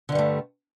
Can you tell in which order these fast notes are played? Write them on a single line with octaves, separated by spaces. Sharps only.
D3 G2 G3 A3